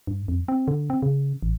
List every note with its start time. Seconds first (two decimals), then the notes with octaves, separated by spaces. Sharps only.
0.07 G2
0.28 F2
0.48 C4
0.68 D3
0.90 C4
1.02 C#3
1.43 A1